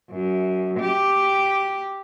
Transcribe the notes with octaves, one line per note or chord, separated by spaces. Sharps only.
F#2
G4